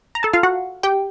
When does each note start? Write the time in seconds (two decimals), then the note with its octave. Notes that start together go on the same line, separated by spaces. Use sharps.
0.15 A#5
0.23 A4 A5
0.33 F4 F5
0.43 F#4 F#5
0.83 G4 G5